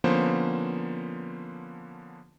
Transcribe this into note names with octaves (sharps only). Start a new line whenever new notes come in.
D3 F3 A#3 B3 C#4 C5